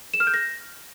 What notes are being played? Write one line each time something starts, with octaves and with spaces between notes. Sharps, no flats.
E7
F6
G6
A#6